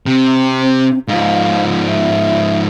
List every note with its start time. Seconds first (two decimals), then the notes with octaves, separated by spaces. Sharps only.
0.06 C3 C4
1.08 G#2 F3 F5
1.87 E5